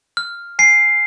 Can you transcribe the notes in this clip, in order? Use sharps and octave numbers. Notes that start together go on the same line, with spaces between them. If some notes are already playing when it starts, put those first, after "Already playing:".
F6
G#5 C7